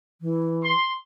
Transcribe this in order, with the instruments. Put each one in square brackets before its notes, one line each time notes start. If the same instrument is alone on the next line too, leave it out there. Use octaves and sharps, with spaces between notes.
[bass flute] E3
[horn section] C6